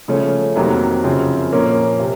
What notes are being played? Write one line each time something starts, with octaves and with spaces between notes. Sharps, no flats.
C#3 F3 A3 C#4
F2 C3 D#3 F#3 A#3
F#2 C#3 F3 C4
A#2 F3 A#3 C#4
C3